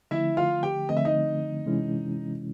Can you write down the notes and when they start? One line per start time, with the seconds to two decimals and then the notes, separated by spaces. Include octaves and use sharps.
0.11 D3 F3 A3 C4 E4 E5
0.37 F4 F5
0.63 G4 G5
0.89 D3 F3 A3 C4 D#5
0.97 E5
1.05 D#4 D#5
1.66 C3 E3 G#3 C#4 E4